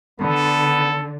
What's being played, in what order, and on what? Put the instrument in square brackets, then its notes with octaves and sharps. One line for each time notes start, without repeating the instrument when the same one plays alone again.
[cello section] D3 [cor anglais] B3 [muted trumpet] A4